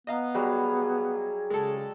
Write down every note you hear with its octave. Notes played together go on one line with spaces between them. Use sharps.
B3 D#5 F5 A#5
F#3 G3 G#4
C#3 G#3 A4